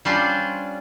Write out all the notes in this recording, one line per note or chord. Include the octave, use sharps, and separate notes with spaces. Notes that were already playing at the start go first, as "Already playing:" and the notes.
G3 C#4 D4 F4 C5